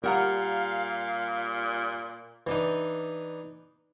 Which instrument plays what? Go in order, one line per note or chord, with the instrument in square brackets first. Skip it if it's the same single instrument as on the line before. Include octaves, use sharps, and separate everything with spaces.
[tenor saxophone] A#2 [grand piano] G3 [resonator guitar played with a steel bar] A#4 F#5 A#5 [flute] F5
[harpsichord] E3 D4 D#4